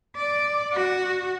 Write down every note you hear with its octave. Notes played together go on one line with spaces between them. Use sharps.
D5
F#4